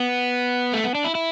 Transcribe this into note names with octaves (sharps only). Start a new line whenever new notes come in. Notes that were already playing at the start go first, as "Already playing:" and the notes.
Already playing: B3
A3
B3
D4
E4
E4